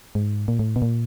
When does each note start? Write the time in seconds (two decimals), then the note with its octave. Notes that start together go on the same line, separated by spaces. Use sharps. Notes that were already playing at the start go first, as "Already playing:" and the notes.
0.15 G#2
0.48 A#2
0.59 A2
0.76 B2
0.82 A#2